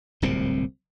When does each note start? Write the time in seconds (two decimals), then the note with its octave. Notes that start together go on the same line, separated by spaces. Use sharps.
0.22 D1 C2 A#2 C4